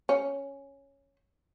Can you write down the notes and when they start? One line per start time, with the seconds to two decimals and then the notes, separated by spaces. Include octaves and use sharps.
0.09 C#4